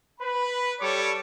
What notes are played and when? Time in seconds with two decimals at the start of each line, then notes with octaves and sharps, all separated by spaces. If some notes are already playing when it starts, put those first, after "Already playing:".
0.21 B4 B5
0.80 G3 A4 C#5 C#6 D6